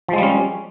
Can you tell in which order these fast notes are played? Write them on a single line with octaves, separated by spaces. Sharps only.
F3 G#3 G3 C#4